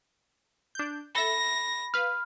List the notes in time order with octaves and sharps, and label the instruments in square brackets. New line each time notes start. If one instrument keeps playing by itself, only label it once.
[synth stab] D4 G6
[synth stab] A4 E5 [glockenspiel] B5 [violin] A#6
[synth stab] B4 F5 [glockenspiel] F6